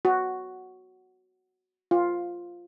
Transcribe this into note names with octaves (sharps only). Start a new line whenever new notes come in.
F#4
F4